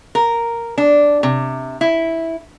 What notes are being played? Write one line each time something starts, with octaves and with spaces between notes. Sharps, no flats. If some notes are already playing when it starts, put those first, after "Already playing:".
A#4
D4
C3
E4